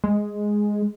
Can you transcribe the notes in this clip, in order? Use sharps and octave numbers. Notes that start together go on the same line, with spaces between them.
G#3